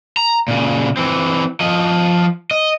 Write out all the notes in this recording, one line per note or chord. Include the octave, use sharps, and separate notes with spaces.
A#5
A#2 C#3
E3 C4
F3 D#5
D#5